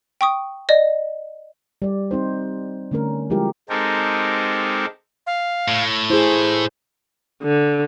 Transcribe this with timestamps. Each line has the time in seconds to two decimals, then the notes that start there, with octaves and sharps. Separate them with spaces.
0.21 G5 C#6 D#6
0.69 D5 D#5
1.82 G3 D5
2.11 C4 D#4 C5
2.91 D3 A3 C#4 A#4
3.30 F3 G3 G#3 E4 G4 A#4
3.69 G#3 C4 D#4 G4 A4 A#4
5.27 F5
5.68 A2
6.10 E4 G#4 C5
7.43 D3